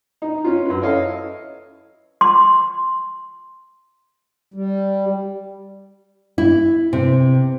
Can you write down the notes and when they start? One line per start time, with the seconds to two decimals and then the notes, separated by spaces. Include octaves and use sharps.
0.22 D#4
0.44 C#4 F4
0.66 F#2 B4
0.81 E4 A4 C#5 D#5 F5
2.21 C6
4.54 G3
6.38 E4
6.93 C3